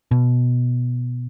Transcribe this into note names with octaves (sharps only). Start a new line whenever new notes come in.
B2